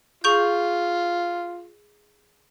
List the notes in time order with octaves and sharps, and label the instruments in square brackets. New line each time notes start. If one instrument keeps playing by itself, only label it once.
[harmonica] F4 [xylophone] G#4 C#6 G6